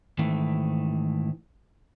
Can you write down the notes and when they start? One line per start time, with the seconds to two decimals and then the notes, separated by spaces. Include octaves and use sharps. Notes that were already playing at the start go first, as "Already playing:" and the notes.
0.18 G#2 D#3 E3 A3